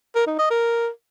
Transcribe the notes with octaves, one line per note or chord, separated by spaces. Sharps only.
A#4
D#4
D#5
A#4